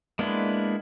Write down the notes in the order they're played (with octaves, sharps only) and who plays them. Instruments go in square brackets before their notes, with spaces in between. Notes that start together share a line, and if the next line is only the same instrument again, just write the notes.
[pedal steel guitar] G#3 A#3 B3 D4 E4